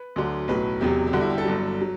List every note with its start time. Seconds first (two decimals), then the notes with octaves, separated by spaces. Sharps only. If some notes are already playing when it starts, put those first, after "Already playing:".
Already playing: B4
0.16 D2 D3 F#3
0.48 B1 A2 F#3 B4
0.81 E1 E2 C3 F#3 G4
1.07 G4
1.13 G1 G2 D3 G3 F#4
1.21 E4
1.30 G4
1.38 A4
1.45 G1 G2 F#3
1.82 F#3